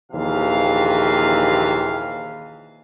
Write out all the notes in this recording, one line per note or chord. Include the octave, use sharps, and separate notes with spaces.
A#1 D#2 C3 E3 G#4 F5